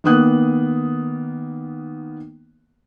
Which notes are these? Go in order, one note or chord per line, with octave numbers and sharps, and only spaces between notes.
D#3 A#3 B3 D#6 F#6